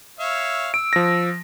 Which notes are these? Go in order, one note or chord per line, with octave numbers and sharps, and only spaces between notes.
C#5 E5 F5
E6 D7
F3 A#6